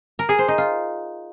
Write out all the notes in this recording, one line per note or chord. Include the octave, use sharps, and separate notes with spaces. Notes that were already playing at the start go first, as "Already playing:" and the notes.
A#4
G#4
C5
D#4
F4